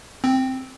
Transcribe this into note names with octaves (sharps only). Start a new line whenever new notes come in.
C4